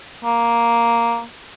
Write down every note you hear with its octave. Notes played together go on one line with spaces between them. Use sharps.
A#3